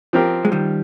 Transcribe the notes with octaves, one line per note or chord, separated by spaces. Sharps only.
F3 C4 G4 A#4
G#3
D#3 G3